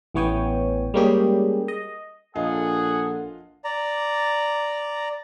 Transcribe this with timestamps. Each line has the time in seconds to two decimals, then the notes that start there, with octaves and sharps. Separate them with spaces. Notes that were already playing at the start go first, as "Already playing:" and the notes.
0.14 A1 E3 B3 C#5 G5 G#5
0.94 G3 G#3 A#3 C#4 G4 G#4
1.68 D#5
2.35 A#1 F4 G#4 A4 D#5 F5 F#5
3.64 D5 A#5